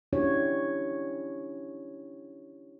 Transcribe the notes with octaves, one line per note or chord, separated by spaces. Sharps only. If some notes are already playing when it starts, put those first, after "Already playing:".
C#4 D4 E4 F#4 G4 C#5